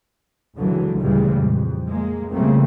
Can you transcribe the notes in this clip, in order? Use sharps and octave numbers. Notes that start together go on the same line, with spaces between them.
C#2 D3 E3 F#3 G#3
D2 A#2 C#3 E3 G3 G#3
F2
G#3 A#3
C#3 F3 G3 A3 A#3 C4